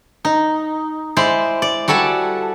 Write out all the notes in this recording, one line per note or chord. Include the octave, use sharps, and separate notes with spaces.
D#4
G#3 E4 C5 D5
D5
G3 F#4 A4 G#5 A5